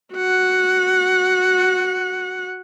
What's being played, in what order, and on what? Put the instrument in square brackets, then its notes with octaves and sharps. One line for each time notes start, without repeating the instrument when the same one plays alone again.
[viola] F#4 F#5